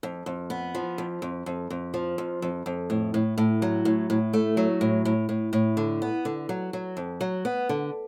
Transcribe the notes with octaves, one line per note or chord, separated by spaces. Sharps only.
F2
F2
B3
F3
F2
F2
F2
F2
F3
F2
F2
F2
A2
A2
A2
F#3
A2
A2
A3
F#3
A2
A2
A2
A2
D3
B3
D3
F#3
F#3
F2
F#3
B3
D3